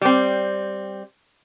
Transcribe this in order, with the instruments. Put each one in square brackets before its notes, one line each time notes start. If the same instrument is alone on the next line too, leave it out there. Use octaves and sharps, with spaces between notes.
[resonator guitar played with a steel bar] G3 C4